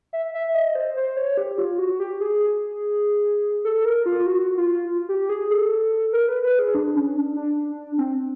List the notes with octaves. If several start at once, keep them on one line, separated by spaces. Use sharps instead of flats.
E5
E5
D#5
C5
C5
C#5
G4
F4
F#4
G4
G#4
A4
A#4
F4
F#4
F4
G4
G#4
A4
A#4
B4
B4
G#4
D4
C#4
D4
D4
C4